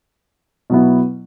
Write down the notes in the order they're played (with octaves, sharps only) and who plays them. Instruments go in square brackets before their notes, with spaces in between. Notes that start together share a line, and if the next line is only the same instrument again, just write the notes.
[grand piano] B2 F#3 B3 E4